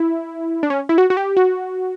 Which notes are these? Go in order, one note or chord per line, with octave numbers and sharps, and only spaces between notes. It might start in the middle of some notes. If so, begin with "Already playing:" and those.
Already playing: E4
D4
C#4
E4
F#4
F#4
G4
F#4